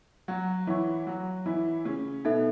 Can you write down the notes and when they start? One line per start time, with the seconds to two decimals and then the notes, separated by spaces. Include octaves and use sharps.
0.28 F#3 F#4
0.67 E3 E4 C#5 F#5 C#6
1.07 F#3 F#4
1.46 E3 E4
1.85 C#3 C#4
2.25 B2 B3 D#4 A4 E5